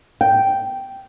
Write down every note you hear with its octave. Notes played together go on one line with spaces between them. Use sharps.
G5